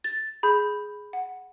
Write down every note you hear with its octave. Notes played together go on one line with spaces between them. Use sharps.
A6
G#4 B5 G6
F#5